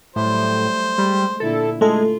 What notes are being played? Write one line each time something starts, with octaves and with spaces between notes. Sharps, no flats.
A2 F#3 G3 A3 C5
G3 G#3
A#2 D3 E4 A4
G#3 A3 F4 A4